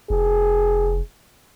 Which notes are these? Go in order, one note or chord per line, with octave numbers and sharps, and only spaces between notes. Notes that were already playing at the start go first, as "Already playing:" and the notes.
F1 G#4